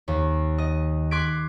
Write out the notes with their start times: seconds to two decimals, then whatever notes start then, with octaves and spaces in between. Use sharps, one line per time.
0.08 D#2
0.58 D#5
1.11 C6 D6 F#6 G#6 B6 D7